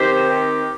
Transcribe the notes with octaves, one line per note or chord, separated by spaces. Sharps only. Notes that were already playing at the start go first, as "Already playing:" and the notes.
Already playing: D#3 C4 D#4 G4 C5
G4